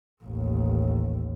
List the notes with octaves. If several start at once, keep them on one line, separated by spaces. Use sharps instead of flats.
A1 D#2